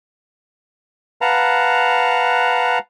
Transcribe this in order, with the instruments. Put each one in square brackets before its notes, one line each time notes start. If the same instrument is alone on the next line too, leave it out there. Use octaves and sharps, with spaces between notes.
[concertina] B4 F5 F#5 A5 A#5